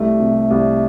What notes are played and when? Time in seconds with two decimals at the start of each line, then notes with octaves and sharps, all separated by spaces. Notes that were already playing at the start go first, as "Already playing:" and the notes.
Already playing: C2 A3
0.20 C3
0.51 C2